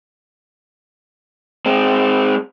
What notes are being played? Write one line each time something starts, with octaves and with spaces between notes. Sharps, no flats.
G#3 C4